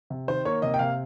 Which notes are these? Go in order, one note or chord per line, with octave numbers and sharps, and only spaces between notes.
C3
D#3 C5
A#3 C#5
C3 D#5
G5
C3 F5